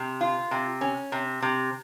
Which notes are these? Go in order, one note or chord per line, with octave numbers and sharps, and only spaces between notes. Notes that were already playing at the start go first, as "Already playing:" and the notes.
Already playing: C3
F4
C3
C#4
C3
C3